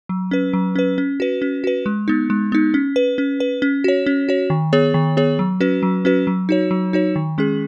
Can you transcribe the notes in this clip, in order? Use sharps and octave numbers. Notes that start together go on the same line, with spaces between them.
F#3
C#4 B4
F#3
C#4 B4
C#4
F#4 B4
C#4
F#4 B4
G#3
B3 D#4
G#3
B3 D#4
C#4
B4
C#4
B4
C#4
F#4 C#5
C#4
F#4 C#5
D#3
B3 G#4 C#5
D#3
B3 G#4 C#5
F#3
C#4 F#4 B4
F#3
C#4 F#4 B4
F#3
D#4 F#4 C#5
F#3
D#4 F#4 C#5
D#3
G#3 C#4 G#4